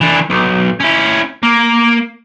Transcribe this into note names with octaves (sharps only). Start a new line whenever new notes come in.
E3 D4
B1
C#4 E4
A#3